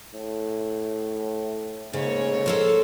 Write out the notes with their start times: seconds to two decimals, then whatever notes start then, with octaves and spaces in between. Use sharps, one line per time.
0.14 A2
1.93 G#2 C#3 A3 A#3 C#5
2.46 A4 A#4 C5